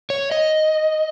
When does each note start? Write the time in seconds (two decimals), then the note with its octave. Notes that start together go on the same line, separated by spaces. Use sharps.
0.10 C#5
0.31 D#5